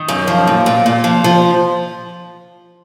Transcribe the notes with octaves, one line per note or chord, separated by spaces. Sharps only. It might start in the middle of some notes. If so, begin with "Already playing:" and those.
Already playing: D#3
F#2
F3
A#2
A#2
A#2
F3
F3